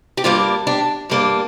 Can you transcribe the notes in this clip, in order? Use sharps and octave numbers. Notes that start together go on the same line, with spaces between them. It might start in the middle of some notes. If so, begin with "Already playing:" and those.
G4
G2 G3 A#3 D4 F4
D4 G4
G2 G3 A#3 D4